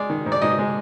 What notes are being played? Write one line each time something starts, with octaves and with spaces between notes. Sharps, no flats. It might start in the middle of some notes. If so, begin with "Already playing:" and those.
Already playing: G#3 D5
D#3
G#2
D5
G#2 D#5
G#3